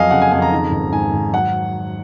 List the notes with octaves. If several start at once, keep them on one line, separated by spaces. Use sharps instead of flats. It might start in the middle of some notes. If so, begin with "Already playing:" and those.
Already playing: F2 F#3 D#5 F5 G#5
C#3 F#5
G#5
F2 G#5
A#5
D#3
G#1
G#2 G#5
G#1
F#3 F#5